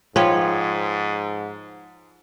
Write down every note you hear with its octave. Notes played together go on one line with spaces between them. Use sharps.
G#2 F3 B4 C#5 F5 G5